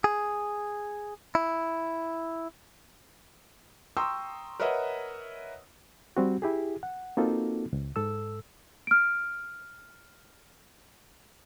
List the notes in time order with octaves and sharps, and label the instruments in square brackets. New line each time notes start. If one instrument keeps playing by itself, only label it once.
[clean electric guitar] G#4
E4
[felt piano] G5 A#5 C6 C#6 D#6 E6
A#4 B4 C#5 D#5 E5 F#5
[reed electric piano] G3 C4 F#4
E4 G4 G#4
F#5
A#3 C4 D#4 F4 F#4 A4
C#2
G#2 A4 E6
[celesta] F6 D7